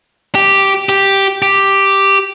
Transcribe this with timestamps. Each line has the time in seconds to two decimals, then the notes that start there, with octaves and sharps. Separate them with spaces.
0.35 G4
0.89 G4
1.42 G4